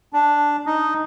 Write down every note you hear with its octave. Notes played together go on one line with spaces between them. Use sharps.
D4
D#4